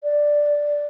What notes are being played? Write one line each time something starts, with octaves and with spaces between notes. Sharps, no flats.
D5